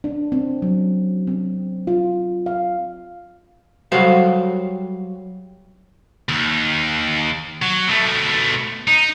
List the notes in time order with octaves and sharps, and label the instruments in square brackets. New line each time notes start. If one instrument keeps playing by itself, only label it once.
[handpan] D4
C4
F#3
C4
F4
F5
[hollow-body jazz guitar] F#3 G3 F#4 A4 C5 F5
[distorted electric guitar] D#2
F#3
B2 A3
D#4